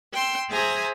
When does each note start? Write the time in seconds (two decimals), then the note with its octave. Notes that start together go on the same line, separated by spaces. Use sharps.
0.12 G5 C6 E6
0.50 G#4 C5 E5 G#5 A#5 D#6